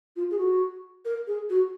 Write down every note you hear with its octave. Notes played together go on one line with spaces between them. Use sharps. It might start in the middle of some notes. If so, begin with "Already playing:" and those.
F4
G#4
F#4
A#4
G#4
F#4